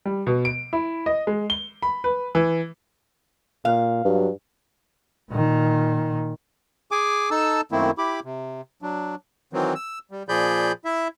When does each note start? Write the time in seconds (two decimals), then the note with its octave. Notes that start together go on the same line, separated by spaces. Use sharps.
0.05 G3
0.27 B2
0.45 D7
0.73 E4
1.06 D#5
1.27 G#3
1.50 G7
1.82 B5
2.04 B4
2.35 E3
3.65 A#2 F5
4.05 G2 F#3
5.31 A#2 D#3
6.91 G#4 G#5 D6
7.31 D#4 A4 A5 E6
7.72 F#2 D#3 A3 A#3 C4 E4
7.98 E4 G4 B5 D6
8.24 C3
8.82 F#3 D4
9.53 D#3 E3 F#3 C4
9.75 E6
10.11 G3
10.29 A#2 F3 G#4 D5 B5 G6
10.85 E4 E5